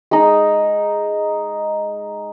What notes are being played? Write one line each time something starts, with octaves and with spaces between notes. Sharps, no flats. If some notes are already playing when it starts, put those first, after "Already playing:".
G#3 D#4